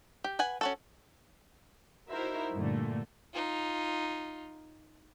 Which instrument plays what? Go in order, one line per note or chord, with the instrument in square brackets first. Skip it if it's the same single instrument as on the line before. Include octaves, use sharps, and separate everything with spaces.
[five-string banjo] G4
B4 F#5 G#5
C#4 F#4 A4
[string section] D#4 E4 F#4 A#4 C5 E5
G2 A#2 D3 A3
[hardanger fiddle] D#4 F4